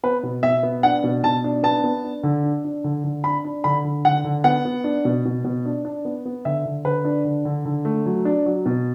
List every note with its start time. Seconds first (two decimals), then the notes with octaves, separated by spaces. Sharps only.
0.03 B3 B4
0.23 B2
0.43 B2 E5
0.63 B3
0.83 D4 F#5
1.04 B2
1.23 B2 A5
1.44 D4
1.63 B3 A5
1.84 B3
2.04 D4
2.23 D3
2.43 D4
2.64 D4
2.84 D3
3.04 D3
3.24 D4 B5
3.45 D4
3.64 D3 B5
3.84 D3
4.05 D3 F#5
4.24 D3
4.44 B3 F#5
4.65 B3
4.84 D4
5.05 B2
5.25 B2
5.44 B2
5.65 D4
5.85 D4
6.05 B3
6.25 B3
6.45 D3 E5
6.65 D3
6.85 D3 B4
7.05 D4
7.25 D3
7.45 D3
7.65 D3
7.85 A3
8.06 F#3
8.25 D4
8.46 F#3
8.66 B2